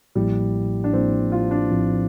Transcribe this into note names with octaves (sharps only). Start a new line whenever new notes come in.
A1 A2 F3 G3 A#3 E4
D4
A1 A2 F3 A#3 C4 E4
F4
D4
A#1 A2 F3 C4 E4